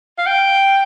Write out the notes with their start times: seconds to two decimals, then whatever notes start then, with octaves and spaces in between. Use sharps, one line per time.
0.18 F5
0.27 G5